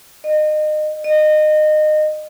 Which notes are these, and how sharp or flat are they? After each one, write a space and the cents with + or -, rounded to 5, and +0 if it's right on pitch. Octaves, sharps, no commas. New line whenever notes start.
D#5 -30
D#5 -25